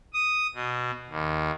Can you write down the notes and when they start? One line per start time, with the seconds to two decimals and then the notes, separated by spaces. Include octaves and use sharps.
0.13 D#6
0.55 B2
1.09 D#2